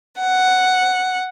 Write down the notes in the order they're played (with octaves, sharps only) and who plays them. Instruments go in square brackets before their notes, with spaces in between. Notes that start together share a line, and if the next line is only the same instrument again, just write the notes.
[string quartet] F#5